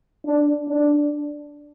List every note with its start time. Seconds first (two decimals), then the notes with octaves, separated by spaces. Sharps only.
0.25 D4
0.68 D4